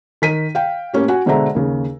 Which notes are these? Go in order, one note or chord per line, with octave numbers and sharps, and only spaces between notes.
D#3 B6 D#7
F5 G5
A2 A#3 C#4 G4
F#4 F#5 G#5
B2 D3 G#3 C5 E5 A#5
D#2 C#3